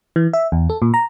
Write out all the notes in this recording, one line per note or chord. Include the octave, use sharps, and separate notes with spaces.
E3
E5
E2
A4
A#2
A#5